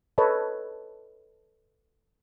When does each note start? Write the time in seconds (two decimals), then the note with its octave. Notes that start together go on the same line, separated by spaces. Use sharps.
0.18 A4 B4 C#5 D#5 A5